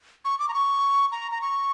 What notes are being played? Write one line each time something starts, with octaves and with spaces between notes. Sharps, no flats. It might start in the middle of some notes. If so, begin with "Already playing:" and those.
C#6
D6
A#5
C#6
A#5
A#5
C#6